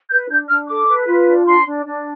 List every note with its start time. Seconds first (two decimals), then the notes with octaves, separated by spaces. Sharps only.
0.11 B4 G6
0.29 D4 G6
0.49 D4 F6
0.69 A4 D6
0.88 B4
1.07 F4
1.27 D4
1.46 D4 C6
1.65 D4
1.85 D4